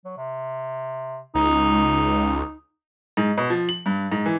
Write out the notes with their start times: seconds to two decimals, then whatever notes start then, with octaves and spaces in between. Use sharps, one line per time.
0.05 F#3
0.18 C3
1.35 C#2 D#4
3.17 G#2
3.38 B2
3.50 F3
3.69 F#7
3.86 G2
4.12 G#2
4.26 E3